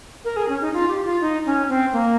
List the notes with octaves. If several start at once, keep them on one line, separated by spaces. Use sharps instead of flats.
A#4
G#4
C#4
D#4
F4
G4
F4
D#4
C#4
C4
A#3